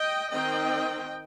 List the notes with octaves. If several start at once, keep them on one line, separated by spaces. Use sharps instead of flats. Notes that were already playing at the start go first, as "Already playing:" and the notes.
Already playing: D#5 G5
D#3 C4 D#5 G5